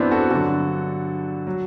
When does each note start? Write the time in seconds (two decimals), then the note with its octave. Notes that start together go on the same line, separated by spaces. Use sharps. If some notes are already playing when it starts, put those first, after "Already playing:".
Already playing: G2 E3 B3 C4 D4 E4 F#4
0.11 F#4 A4
0.31 G2 D3 F#3 F#4 A4
1.47 F#3